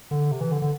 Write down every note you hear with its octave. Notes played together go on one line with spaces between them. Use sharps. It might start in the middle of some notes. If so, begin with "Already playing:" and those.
D3
C3
E3
D3
D3